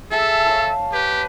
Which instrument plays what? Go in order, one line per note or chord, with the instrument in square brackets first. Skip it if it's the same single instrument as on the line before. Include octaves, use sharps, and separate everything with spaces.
[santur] G#4 A5 [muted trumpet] A4 [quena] E5
[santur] C#5 F5 A5
[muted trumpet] G4 [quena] B4